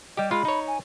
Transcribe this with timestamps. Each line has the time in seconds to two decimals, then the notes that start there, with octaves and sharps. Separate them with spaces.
0.17 G3 G4 D#5
0.31 G#3 F4 F5 B5
0.45 D#4 C#5
0.68 G#5